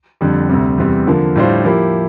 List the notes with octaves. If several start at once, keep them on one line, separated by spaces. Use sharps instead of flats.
F2 D3 G3
D2 C3 G3
E2 C3 G3 C4
D3 F3 A#3
A2 G3 D4 F4 C5
F3 A#3 E4 G4